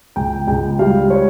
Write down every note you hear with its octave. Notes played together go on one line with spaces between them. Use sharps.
C#2 G5
C#2 G5
G3 F5
C#5